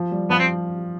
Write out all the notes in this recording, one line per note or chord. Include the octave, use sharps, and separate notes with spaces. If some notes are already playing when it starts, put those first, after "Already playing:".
Already playing: F3
G3
F3 B3
C4